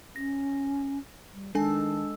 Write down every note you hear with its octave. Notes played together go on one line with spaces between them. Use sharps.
C#4 A#6
G3
D#3 G#3 D4 A4 G#5